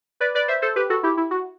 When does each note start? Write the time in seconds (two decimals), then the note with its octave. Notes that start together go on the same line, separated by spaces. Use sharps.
0.20 B4 D5
0.35 B4 D5
0.48 C5 E5
0.62 A4 C5
0.76 G4 B4
0.90 F#4 A4
1.03 E4 G4
1.17 E4
1.31 F#4